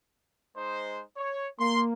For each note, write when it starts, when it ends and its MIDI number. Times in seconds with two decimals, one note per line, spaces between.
0.56 1.03 56
0.56 1.03 63
0.56 1.03 72
1.17 1.49 73
1.59 1.93 58
1.59 1.82 84